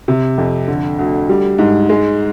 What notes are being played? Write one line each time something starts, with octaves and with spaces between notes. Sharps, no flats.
C3
F2
D3
D2
G3
G#2
G#3